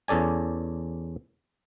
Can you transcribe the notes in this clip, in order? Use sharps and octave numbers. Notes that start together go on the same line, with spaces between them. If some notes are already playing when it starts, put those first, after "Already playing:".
E2 C#4 A4 D5 G#5